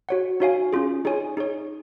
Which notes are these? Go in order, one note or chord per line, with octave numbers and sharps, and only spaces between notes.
F#4 C#5 F#5
D#4 F#4 C#5 F5 G#5
C#4 F4 G#4
D#4 G#4 C#5 G#5
D#4 G#4 C#5